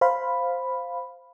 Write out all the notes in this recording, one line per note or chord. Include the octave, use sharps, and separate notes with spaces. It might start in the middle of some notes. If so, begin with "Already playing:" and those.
C5 F5 B5